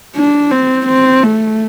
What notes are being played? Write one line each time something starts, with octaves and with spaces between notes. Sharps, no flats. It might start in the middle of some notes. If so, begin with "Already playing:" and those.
D4
C4
C4
A3